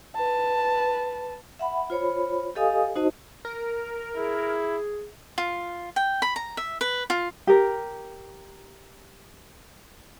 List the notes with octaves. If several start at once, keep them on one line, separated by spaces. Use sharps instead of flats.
B4 A5
E5 F#5 B5
F4 C5 C#5 B5
G4 A4 D#5 F5 G#5 D#6
D#4 F#4 C5 D#5 A5
A#4
E4 G#4
F4
G5
B5
A#5
E5
B4
F4
G4 A#4